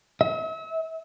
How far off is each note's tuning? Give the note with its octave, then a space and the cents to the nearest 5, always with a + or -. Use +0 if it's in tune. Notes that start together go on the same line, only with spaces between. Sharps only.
E5 -40